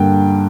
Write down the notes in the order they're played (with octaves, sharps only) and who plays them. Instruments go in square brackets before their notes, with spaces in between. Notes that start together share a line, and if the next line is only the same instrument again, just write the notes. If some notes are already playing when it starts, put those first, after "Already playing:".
Already playing: [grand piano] G2 D3 A#3 G5